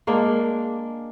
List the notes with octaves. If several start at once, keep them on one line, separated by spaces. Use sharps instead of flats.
G#3 A#3 D4